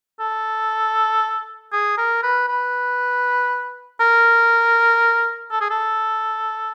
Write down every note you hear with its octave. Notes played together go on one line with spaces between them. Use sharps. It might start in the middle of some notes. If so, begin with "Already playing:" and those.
A4
G#4
A#4
B4
B4
A#4
A4
G#4
A4